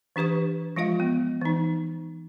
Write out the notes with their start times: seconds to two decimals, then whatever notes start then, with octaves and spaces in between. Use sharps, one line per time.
0.16 E3 D4 G4 B4 C#6
0.76 F3 G#3 F4 D#5 F5
1.00 B3
1.41 E3 D#4